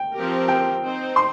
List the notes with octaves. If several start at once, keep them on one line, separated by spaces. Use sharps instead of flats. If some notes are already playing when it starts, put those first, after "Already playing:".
Already playing: G5
F3 C4 G4 A#4
G5
C4 D#4 C5
C6